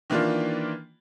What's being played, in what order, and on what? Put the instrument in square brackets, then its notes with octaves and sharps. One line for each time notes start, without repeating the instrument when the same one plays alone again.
[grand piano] D#3 E3 A#3 D4 F4